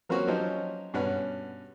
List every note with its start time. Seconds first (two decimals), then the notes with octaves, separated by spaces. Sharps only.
0.09 F#3 A#3 C4 C#4 F#4
0.27 F3 F#3 C#4 D#4 G4 C5
0.94 G2 B2 C#4 B4 F#5